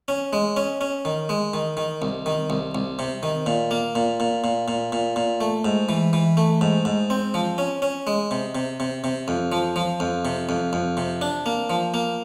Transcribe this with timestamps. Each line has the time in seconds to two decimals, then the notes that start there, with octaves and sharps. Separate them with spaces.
0.08 C#4
0.33 G#3
0.57 C#4
0.81 C#4
1.05 D#3
1.29 G#3
1.54 D#3
1.77 D#3
2.02 C2
2.26 D#3
2.50 C2
2.75 C2
2.99 C3
3.23 D#3
3.46 A#2
3.71 A#3
3.95 A#2
4.20 A#2
4.44 A#2
4.68 A#2
4.92 A#2
5.16 A#2
5.41 A3
5.65 G#2
5.89 E3
6.13 E3
6.37 A3
6.61 G#2
6.85 G#2
7.10 C4
7.34 F3
7.58 C#4
7.82 C#4
8.07 G#3
8.31 C3
8.55 C3
8.80 C3
9.04 C3
9.28 F2
9.52 F3
9.76 F3
10.00 F2
10.25 C3
10.49 F2
10.73 F2
10.97 C3
11.21 D4
11.46 A#3
11.70 F3
11.94 A#3